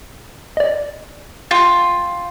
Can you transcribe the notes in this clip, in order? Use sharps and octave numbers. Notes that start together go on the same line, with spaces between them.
D5 D#5
F4 G5 A6